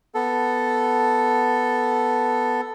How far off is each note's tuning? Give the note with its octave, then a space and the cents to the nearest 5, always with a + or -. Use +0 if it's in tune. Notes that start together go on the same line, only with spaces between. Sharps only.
B3 +0 A4 +0